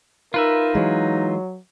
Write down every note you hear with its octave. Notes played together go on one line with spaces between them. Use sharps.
D#4 F4 A#4 B4 E5
E3 F#3 G#3